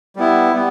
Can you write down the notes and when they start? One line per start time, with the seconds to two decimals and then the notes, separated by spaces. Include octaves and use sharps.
0.16 G3 B3 E4
0.53 G3 B3